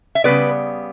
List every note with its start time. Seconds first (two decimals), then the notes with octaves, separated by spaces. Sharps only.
0.15 E5
0.24 C#3 G3 B3 B4 D5